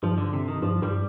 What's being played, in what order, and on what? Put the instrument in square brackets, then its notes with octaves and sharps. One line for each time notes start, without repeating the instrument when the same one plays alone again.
[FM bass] G2 [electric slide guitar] F3
[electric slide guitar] D3
C3
D#3
[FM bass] G2 [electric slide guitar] F3
[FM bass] G2 [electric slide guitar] G3